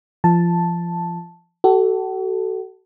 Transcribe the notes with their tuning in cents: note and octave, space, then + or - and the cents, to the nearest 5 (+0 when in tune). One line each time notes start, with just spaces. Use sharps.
F3 -25 A5 +0
F#4 +40 A4 +0